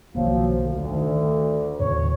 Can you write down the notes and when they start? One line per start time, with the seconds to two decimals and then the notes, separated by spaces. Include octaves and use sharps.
0.15 B1 D#3 F3 F#3 A#3 F4
0.63 D2
0.91 D#3
1.80 D#2 A2 C#3 C#5